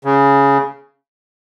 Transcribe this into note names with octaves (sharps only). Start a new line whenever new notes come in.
C#3